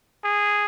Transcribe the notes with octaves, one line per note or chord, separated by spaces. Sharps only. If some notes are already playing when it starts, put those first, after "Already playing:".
G#4